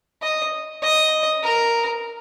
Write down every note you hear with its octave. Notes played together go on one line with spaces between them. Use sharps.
D#5
D#5
A#4